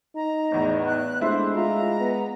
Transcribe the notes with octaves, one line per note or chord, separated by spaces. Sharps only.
D#4 A#5
E2 A2 B3
F#6
G#3 A3 D4 E4 C5
F4 A#5
B3